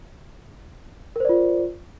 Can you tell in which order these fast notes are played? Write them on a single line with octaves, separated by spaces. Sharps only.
A#4 C5 D5 F4